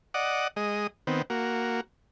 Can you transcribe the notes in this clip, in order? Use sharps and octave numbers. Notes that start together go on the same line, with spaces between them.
D5 D#5 F#5
G#3 D#5
D#3 B3 C4
A#3 F#4